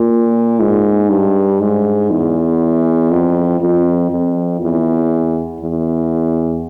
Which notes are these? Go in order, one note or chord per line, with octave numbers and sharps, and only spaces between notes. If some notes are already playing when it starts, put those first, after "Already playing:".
Already playing: A#2
G#2
G2
G#2
E2
F2
F2
F2
E2
E2